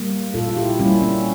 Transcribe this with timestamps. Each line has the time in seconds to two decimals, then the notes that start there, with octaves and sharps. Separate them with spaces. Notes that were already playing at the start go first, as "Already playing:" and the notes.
Already playing: G3 A#3
0.34 A#2 F4 A4
0.49 F4
0.57 E4 G4
0.80 G3 A#3 C#4 E4
1.02 C#4